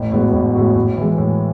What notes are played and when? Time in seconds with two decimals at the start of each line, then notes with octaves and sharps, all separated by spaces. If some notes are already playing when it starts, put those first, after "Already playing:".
Already playing: A1
0.12 A2 G#3 B3 F#4
0.33 A1
0.54 A2 G#3 B3 F#4
0.75 A2
0.97 E3 G#3
1.18 A2